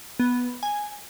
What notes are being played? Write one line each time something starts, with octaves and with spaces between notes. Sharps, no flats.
B3
G#5